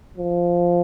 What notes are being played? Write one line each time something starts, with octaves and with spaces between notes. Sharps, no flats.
F3